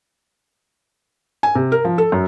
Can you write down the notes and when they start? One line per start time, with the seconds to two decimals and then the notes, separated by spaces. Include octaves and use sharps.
1.43 G#5
1.55 C3
1.72 A#4
1.85 F3
1.98 A4
2.12 F#2